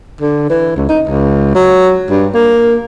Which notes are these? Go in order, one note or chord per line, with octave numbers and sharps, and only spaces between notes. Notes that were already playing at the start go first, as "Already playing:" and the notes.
D3
E3
C#2
D#4
C#2
F#3
G2
A#3